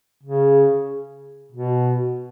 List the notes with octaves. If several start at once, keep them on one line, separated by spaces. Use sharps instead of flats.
C#3
B2